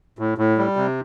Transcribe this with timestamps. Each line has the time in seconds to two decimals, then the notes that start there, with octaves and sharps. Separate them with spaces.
0.19 A2
0.38 A2
0.58 G3
0.76 C3